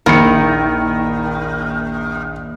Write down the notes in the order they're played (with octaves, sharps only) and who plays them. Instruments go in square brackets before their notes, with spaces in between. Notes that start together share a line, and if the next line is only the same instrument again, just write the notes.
[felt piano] A#1 C#7 [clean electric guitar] D#2 E4 [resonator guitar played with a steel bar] D#3 [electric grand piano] A#4